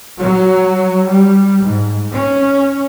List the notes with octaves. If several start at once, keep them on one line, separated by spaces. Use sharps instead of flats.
F#3
G3
G#2
C#4